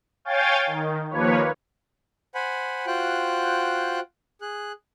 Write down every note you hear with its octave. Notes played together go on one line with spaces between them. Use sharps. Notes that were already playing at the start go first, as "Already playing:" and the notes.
C#5 F5 G5 G#5 G6 A6
D#3
D#2 F3 A#3 B4 C#5
C5 F#5 G#5 B5
F4 F#4 C5 G5 F#6
G#4 F#6